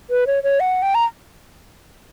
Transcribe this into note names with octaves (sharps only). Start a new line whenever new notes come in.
B4
C#5
C#5
F#5
G5
A#5